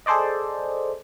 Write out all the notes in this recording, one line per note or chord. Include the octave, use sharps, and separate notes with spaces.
G#4 A4 C5 D5 D#5